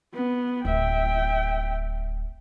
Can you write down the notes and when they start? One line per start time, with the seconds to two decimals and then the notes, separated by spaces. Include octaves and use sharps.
0.14 B3
0.65 D1 E5 G5